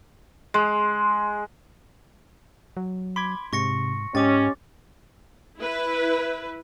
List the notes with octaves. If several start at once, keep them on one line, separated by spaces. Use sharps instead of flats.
G#3
F#3
B5 C6 D6 G#6
G#2 C3 C#6 A#6 C#7
G#2 C#4 G4 D#5 D6 A6
E4 B4